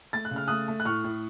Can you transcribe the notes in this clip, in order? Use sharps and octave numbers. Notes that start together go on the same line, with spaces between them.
A3 A6
F#6
C#3
F6
A3 D#6 F#6
A3
F#6
A2 C#6 F6
A2